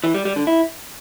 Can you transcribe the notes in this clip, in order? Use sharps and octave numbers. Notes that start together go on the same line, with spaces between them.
E3
G3
G3
D3
E4